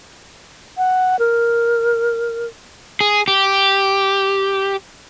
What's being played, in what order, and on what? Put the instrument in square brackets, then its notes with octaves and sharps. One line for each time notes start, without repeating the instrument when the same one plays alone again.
[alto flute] F#5
A#4
[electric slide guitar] G#4
G4